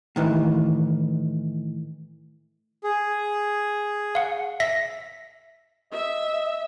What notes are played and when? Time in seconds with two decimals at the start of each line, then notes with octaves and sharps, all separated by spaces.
0.16 A2 D#3 E3
2.84 G#4
4.15 F5 F#5
4.60 E5 A#6 B6
5.92 D#5 E5